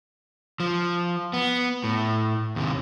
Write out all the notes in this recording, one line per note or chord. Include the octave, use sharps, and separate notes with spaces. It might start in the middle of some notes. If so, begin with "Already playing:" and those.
F3
B3
A2
D#2 C3